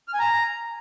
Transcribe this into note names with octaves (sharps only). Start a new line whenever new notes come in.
F6
G#5
A#5